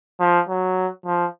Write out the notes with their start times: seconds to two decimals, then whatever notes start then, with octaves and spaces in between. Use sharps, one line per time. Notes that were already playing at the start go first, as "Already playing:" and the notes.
0.20 F3
0.49 F#3
1.06 F3